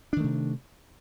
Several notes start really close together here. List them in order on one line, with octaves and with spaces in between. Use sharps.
D4 D#3 A3 C3